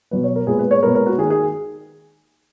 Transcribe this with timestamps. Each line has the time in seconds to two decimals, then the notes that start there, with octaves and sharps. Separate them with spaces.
0.11 B2 F#3 B3 B4
0.24 C#5
0.36 A#4
0.47 A#2 G#3 B3 G#4
0.59 B4
0.71 C#5
0.82 A#2 G#3 B3 A#4
0.95 A#4
1.06 F#4
1.18 D#3 A#3 G#4
1.30 G#4